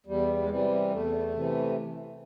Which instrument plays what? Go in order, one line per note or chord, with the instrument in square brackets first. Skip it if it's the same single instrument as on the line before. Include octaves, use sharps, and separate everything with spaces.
[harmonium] E2 G3
G#3
C3 E3 G3
E2 A3
C3 E3